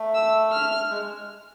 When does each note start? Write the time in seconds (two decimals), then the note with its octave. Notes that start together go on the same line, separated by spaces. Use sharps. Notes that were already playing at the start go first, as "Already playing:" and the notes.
Already playing: A3
0.14 E6
0.52 F6
0.90 G#3